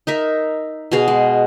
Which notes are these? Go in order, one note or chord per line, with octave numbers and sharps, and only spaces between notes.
D#4 A#4 E5
B2 F#4 G#4 F5
G#3